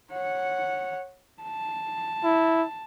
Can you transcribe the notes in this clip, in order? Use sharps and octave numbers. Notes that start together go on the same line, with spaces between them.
C#5 F#5
A5
E4